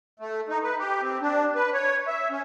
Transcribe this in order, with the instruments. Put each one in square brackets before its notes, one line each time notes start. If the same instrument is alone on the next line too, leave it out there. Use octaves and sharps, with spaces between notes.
[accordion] A3
D#4
B4
G4
C4
D4
B4
C#5
E5
C#4